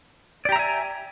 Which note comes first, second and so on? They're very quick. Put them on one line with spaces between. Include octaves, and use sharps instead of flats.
D5 G4 A#5 E5 G#5